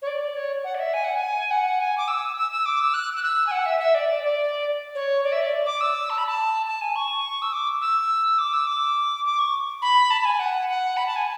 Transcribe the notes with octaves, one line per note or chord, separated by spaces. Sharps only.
C#5
D5
C#5
F#5
D5
E5
G#5
F#5
G#5
F#5
G#5
D6
E6
E6
E6
D6
E6
F#6
F#6
E6
G#5
F#5
E5
E5
D5
D5
D5
C#5
D5
E5
D5
D6
E6
A5
B5
A5
A5
G#5
C#6
E6
D6
E6
D6
E6
D6
D6
C#6
B5
A5
A5
G#5
F#5
F#5
B5
A5
G#5